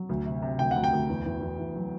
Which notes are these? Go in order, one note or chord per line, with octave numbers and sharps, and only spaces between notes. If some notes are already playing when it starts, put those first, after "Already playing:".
Already playing: F#3
D2
C3
C3
D2 G5
F#5
D2
G5
D2
E2
E2
E2
E2
F#3